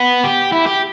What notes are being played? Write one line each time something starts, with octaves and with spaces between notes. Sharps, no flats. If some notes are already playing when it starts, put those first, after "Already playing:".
Already playing: B3
G4
E4
G4